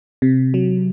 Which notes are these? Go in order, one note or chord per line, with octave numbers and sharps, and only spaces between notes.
C3
F#3